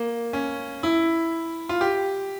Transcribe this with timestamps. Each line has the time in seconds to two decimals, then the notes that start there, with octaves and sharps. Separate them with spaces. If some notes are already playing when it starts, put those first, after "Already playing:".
Already playing: A#3
0.33 C#4
0.83 E4
1.69 F4
1.81 G4